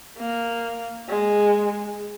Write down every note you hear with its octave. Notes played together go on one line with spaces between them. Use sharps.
A#3
G#3